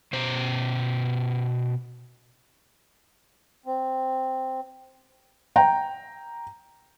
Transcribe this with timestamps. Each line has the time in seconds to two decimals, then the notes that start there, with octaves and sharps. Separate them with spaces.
0.13 B2 C5
3.66 C4
5.56 G5 A#5